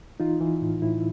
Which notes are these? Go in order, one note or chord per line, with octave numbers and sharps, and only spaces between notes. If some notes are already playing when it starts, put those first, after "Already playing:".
E3 D#4 F4
E3
A2
A2 E4